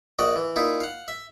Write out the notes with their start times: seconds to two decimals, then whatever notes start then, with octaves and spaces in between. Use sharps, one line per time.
0.19 A#1 F#4 D5 D#5
0.36 E3
0.56 A#2 D#4 E4
0.80 F5 F#5
1.08 E5